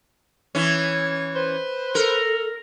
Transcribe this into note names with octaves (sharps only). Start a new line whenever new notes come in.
E3 C#4
B4 C5
A4 A#4